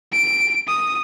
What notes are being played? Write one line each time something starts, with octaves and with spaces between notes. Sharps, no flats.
D7
D#6